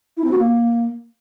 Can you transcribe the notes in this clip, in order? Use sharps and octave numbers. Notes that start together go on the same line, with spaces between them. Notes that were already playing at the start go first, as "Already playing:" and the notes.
E4
C4
F#4
A#3